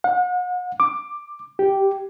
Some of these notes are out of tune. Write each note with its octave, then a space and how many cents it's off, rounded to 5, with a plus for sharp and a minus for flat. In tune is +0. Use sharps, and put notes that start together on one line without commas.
F#5 -40
D6 +15
G4 -5